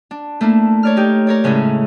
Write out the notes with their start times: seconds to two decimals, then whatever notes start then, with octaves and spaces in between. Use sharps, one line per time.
0.11 D4
0.41 A3 A#3 D4 E4
0.83 C#5 D5 F6
0.97 D#4 G4
1.27 A#4 C#5 D5
1.44 A2 C#3 G#3 C#4 E4